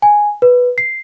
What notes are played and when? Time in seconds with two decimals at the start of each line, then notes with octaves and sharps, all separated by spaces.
0.02 G#5
0.42 B4
0.78 C7